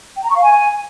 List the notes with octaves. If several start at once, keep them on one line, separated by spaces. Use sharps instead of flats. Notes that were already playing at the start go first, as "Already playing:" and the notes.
G5
A#5
C#6
F5
G#5